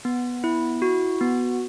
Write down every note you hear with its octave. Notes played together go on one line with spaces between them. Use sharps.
B3
E4
F#4
B3